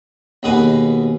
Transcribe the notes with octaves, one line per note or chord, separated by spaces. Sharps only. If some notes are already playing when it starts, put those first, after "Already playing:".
D#2 B2 G#4 B4 G#5